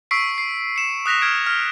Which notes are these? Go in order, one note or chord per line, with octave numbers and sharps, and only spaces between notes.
C#6 E6 B6 C7 D7
C7
C#7 E7
D#6 F#6 A#6 B6 F7
F6 G#6 D7
F6